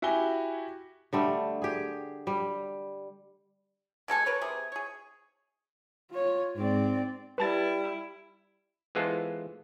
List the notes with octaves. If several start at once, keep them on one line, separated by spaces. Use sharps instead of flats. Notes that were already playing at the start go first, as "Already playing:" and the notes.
E4 F#4 G4 F#5 G#5 G7
D3 G3 A3
G4 G#4
G3
B2 G#3 A4 G#5
A#4 B4 C#5
C3 G#4
G#4 C#5
F4 C#5
G#2 C4 D5
G3 E4 B4 A5 A6
E3 G#3 B3 F4 A4 C5